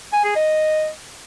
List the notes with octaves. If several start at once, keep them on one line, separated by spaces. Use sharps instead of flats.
G#5
G#4
D#5